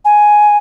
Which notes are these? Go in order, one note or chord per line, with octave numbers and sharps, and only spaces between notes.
G#5